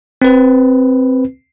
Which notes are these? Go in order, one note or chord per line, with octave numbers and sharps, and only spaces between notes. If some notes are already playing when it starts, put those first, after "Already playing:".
C4 B4